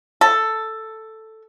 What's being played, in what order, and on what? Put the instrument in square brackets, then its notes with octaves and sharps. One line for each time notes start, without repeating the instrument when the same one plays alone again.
[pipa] A4